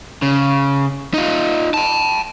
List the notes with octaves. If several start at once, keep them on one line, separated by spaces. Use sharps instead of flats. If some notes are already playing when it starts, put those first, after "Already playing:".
C#3
D#4 F4
G5 A5